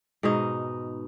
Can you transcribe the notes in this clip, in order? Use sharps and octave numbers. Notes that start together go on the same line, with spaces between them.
G#2 B2 D#4